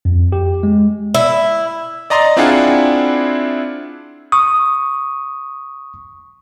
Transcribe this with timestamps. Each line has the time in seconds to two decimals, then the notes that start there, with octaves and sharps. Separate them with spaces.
0.05 F2
0.32 G4
0.63 G#3
1.15 E4
2.10 D5 D#5 A#5 C6 A6
2.37 C4 D4 E4 F4 G#4 F#5
4.32 C#6 D#6